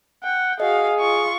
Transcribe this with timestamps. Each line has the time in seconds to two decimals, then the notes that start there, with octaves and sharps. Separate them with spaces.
0.24 F#5 G5
0.60 F#4 G#4 D#5 F5 D#6
0.99 F4 C#6